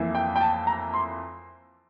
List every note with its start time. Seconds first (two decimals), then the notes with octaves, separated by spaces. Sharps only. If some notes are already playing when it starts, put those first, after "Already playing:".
Already playing: F2 E3 A#3 E4
0.15 G5
0.36 G5
0.41 A5
0.67 A#5
0.94 C6